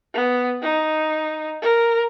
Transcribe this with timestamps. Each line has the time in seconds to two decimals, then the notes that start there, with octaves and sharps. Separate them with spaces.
0.14 B3
0.62 D#4
1.62 A#4